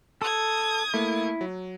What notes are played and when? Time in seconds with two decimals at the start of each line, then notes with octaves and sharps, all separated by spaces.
0.22 A4 D#6 G#6
0.94 A3 A#3 E4
1.41 F#3